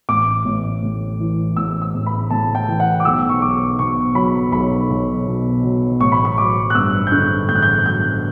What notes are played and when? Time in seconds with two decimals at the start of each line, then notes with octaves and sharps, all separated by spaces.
0.09 A1 D6
0.45 A1
0.83 A2
1.20 E3
1.56 A1 E6
1.82 E6
1.94 A1
2.06 B5
2.30 A2 A5
2.55 G5
2.68 E3
2.80 F#5
3.00 D6
3.05 B1 E6
3.29 C#6
3.42 B1 D6
3.79 B2 C#6
4.15 F#3 B5
4.52 B1 B5
4.90 B1
5.26 B2
5.64 F#3
6.00 A1 C#6
6.12 B5
6.25 C#6
6.38 F#3 D6
6.70 F#6
6.75 G2 E6
7.07 G6
7.11 D3 F#6
7.48 A1 G6
7.56 F#6
7.62 G6
7.85 F#3 G6